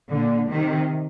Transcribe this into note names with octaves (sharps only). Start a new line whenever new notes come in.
A#2 D3
C3 D#3